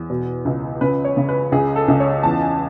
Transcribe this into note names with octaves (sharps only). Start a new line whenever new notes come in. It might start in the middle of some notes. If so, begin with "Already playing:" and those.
Already playing: E2
B2
C#2
C#3 B4
C#5
C#3
B4
C#2 G#4
A4
C#2
C#5
E2 A5
G#5